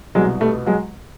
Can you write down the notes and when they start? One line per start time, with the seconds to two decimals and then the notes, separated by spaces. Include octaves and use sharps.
0.15 C2 B2 F#3 G#3
0.41 G3 A3
0.66 F#3 G#3